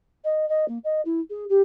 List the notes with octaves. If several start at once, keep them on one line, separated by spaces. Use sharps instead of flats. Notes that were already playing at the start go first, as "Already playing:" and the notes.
D#5
D#5
A#3
D#5
E4
G#4
G4